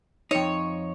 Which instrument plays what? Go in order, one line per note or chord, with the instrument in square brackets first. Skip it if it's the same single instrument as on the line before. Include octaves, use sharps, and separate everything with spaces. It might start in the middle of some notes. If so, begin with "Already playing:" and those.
[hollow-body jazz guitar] F2 D#4 [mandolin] C#5